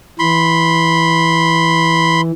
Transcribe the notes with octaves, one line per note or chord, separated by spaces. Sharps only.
E3 B5 C6